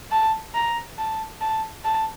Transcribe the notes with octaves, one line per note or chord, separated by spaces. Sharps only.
A5
A#5
A5
A5
A5